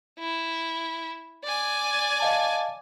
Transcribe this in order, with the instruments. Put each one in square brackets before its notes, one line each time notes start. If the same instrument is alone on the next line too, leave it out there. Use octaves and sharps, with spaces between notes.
[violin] E4
D5 G#5
[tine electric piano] D#5 F5 A5